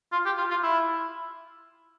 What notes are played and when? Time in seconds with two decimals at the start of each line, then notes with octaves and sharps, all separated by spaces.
0.12 F4
0.25 G4
0.38 F4
0.50 F4
0.63 E4